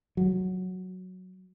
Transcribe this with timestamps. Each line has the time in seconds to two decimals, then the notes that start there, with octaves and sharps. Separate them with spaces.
0.17 F#3